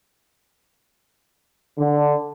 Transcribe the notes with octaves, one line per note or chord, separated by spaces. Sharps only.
D3